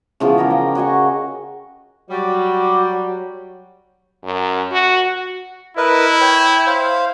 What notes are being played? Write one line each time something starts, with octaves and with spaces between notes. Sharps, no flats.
C#3 E3 F3 B3
G4 A#4 D#5
G5
F#4 D#5 G#5 C#6
F#3 G3 F#4 D5
F#2
F#4
E4 A#4 B4 D#5
C#5 G5
C5 F5